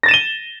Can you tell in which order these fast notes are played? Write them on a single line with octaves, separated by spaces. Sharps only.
A#6 A6 E7 D#7 G7